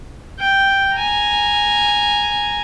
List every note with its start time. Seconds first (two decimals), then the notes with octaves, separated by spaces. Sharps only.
0.39 G5
0.96 G#5 A#5